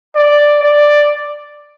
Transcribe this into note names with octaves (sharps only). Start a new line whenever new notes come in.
D5
D5